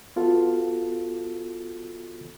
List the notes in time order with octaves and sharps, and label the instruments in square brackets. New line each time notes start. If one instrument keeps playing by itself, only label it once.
[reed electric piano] B3 F4 F#4 A4